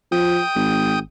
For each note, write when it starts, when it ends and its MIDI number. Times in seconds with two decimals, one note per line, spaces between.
0.12 0.40 53
0.12 0.99 79
0.12 0.99 87
0.56 0.99 32